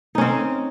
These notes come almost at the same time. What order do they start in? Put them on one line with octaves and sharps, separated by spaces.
D#4 C#4 C4